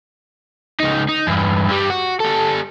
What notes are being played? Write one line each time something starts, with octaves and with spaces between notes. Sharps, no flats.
C#2 D#4
D#4
E2 G2
G2 G3
F#4
G3 A4